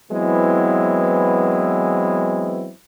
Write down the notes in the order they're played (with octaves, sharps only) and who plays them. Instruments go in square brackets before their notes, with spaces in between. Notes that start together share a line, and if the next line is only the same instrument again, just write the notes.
[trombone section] E3 F#3 G#3 B3 C4 E4